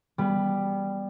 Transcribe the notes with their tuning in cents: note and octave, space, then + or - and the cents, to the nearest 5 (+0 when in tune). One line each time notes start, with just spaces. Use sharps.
G3 +5 B3 -20